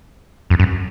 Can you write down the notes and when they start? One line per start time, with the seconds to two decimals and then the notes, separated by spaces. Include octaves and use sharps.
0.50 F2
0.60 F#2